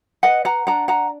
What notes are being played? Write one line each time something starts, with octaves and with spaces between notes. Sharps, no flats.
B4 D#5 F#5
F#5 A#5
D4 F#5 A#5
F#5 A#5